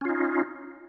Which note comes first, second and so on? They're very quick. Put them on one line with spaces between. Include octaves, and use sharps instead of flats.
C#4 F4 D#4